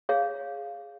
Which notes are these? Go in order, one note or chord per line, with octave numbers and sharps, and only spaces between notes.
G#4 C#5 F5